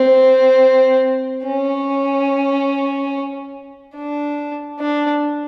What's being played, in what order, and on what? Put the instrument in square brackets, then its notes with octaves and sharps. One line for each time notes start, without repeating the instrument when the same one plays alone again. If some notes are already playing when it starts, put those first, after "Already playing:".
Already playing: [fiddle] C4
C#4
D4
D4